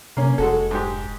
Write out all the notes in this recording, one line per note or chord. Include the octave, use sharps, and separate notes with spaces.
C3 A#3 C#4
F1 G#3 F#4 A4
G#2 G4